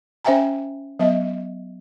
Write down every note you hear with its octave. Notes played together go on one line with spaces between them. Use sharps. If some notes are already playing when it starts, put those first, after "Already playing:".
C#4 C5 E5 G5 G#5 A#5
F#3 B3 D#5 E5